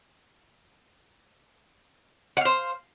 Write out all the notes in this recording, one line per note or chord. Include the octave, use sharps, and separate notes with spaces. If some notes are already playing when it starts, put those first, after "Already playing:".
C5 F5 F#5